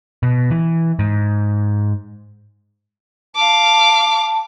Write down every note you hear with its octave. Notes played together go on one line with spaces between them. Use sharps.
B2
E3
G#2
F5 A5 D6